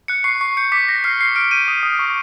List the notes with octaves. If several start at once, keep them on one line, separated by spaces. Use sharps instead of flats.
F#6 C#7
C#6 C7
C#6 C7
G6 C#7
D6 B6
G6 A#6
F6 C7
F6 C7
F6 D7
G6 D#7
D#6
D#6
C#6